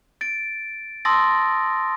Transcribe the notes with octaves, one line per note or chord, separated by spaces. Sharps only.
A6 D7
A5 C6 D#6 E6 A6 A#6